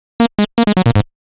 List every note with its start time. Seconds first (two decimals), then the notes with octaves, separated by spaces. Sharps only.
0.20 A#3
0.39 G#3
0.58 A#3
0.67 G#3
0.77 F#3
0.86 A#2
0.95 G#2